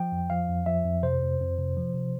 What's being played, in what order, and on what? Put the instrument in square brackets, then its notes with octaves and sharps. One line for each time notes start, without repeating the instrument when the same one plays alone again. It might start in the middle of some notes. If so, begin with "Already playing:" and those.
Already playing: [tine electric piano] F3 G5
F2
F3 F5
F2
F3 E5
F2
C3 C5
F2
F2
C3
F3
C3